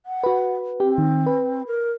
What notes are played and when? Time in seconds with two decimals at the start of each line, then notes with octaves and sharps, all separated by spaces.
0.06 F#5
0.24 F#4 B4
0.80 C4 G4
0.98 D#3
1.26 B4
1.67 A#4